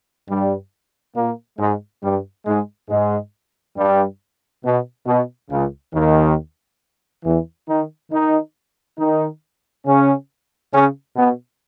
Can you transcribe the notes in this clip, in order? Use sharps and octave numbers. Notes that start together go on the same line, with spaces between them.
G2 G3
A#2 A#3
G#2 G#3
G2 G3
G#2 G#3
G#2 G#3
G2 G3
B2
B2
C#2 C#3
D#2 D#3
E2 E3
D#3 D#4
D#3 D#4
D#3 D#4
C#3 C#4
C#3 C#4
B2 B3